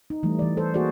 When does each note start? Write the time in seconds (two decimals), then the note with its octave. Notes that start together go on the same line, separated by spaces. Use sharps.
0.10 D#4
0.23 E3 G3 A3
0.39 E3 D5
0.57 A4 C5
0.74 A#3 F#4 G#4 C5 D5